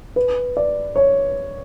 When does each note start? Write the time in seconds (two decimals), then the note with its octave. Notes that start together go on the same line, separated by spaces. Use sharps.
0.16 B4
0.57 D5
0.96 C#5